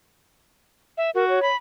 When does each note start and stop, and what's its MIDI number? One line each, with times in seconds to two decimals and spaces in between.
0.98 1.10 76
1.15 1.42 66
1.15 1.25 70
1.29 1.48 73
1.43 1.56 83